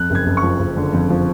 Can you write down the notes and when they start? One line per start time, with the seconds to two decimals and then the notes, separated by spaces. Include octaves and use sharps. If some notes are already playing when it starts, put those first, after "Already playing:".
Already playing: F2 F#6
0.10 F#1
0.15 G#6
0.26 F#1
0.37 C#6
0.43 F3
0.59 F#1
0.77 D3
0.93 F2
1.10 F3